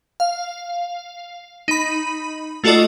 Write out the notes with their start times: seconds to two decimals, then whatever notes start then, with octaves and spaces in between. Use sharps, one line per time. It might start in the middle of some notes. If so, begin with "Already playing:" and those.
0.20 F5
1.68 D#4 B5
2.64 A3 F4 F#4 A4 D5 D#5